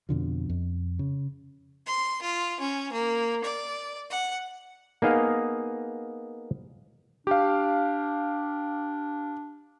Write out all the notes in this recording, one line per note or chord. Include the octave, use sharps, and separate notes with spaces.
F2 B2 D3 F3
F2
C#3
C6
F4
C#4
A#3
D5
F#5
A#3 B3 D#4 G#4 D#5 F5
D4 G4 F5